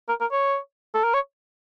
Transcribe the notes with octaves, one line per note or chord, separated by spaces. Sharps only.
A#4
A#4
C#5
A4
A#4
C#5